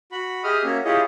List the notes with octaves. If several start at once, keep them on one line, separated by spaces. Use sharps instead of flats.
F#4 B5
G4 G#4 D#5 E5 D#6 F6
A#3 C#4 F#4 E5
E4 F4 G4 G#4 C#5 D#5